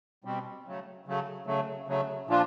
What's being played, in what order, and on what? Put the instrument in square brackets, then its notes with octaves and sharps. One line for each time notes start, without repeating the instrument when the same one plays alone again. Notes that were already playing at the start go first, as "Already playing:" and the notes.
[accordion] B2 G3 C4
C#3 F#3 A3
C#3 F#3 A3
C#3 F#3 A3
C#3 F#3 A3
A#2 F3 A#3 D4 F4